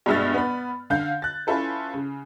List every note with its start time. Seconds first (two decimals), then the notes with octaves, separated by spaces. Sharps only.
0.06 G2 B2 G#3 E5 F6 A6
0.34 B3 B5
0.90 D3 F5 G6
1.22 F#6 A6
1.47 C#4 E4 F4 A4 B4
1.94 C#3